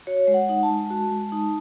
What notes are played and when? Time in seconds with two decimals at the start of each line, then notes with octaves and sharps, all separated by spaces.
0.07 F#4 C#5
0.27 G#3
0.34 F#5
0.49 D#4
0.63 A5
0.70 G#3
0.90 F#4
1.11 G#3
1.32 D#4